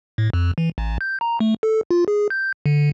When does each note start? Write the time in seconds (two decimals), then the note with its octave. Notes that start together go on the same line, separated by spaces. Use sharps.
0.18 A2
0.33 F2
0.58 E3
0.78 A1
1.01 G6
1.21 A#5
1.40 A3
1.63 A4
1.91 F4
2.08 G#4
2.30 G6
2.66 D3